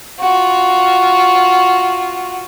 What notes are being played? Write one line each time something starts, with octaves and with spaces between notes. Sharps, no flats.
F4 F#4